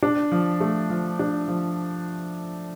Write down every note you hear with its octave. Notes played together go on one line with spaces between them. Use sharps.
D4
F3
A3
F3
D4
F3